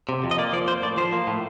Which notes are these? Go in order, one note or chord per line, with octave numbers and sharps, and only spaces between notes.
C3
F2
D#5
A#3 D5
F3 D5
A#3 C5
A2 D5
F3 C5
A#3
A2